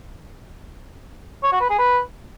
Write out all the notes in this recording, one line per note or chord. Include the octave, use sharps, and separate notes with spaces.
C#5
F#4
B4
G#4
B4